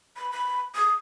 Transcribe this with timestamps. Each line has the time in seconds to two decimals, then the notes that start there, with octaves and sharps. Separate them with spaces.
0.16 B5
0.31 B5
0.75 D#6